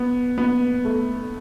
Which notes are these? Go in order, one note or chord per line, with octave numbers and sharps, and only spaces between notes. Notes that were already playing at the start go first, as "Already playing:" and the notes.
Already playing: B3
B3
A3